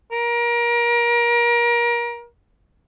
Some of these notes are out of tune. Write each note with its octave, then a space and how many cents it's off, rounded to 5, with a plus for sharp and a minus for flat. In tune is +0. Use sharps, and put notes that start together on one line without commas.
A#4 +30